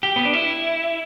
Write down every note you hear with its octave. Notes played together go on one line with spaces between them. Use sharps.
G4
B3
D4
E4